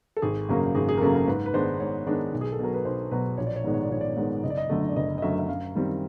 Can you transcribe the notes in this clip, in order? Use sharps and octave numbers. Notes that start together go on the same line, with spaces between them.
A4
G#1 G#4
F#2 C#3 F#3 A#3
G#1 G#4
G#4
A#4
F#2 C#3 F#3 A#3 A4
A#4
G#2 B4
B4
D#3 G#3 B3 D4 C5
G#2 C#5
D#3 G#3 B3 D4
B1
G#4
A4
B2 F#3 A#4
B4
B1 C5
B2 F#3 B4
A#1 C#5
D5
C#5
G#2 D#3 G#3 B3 D5
C#5
D5
A#1 C#5
D5
C#5
G#2 D#3 G#3 B3
F#1 D#5
D5
D#5
F#2 D3 F#3 A3
D5
F#1 D#5
D#5
F#2 D3 F#3 A3 E5
E5
F#2 F5
D#3 G3 C4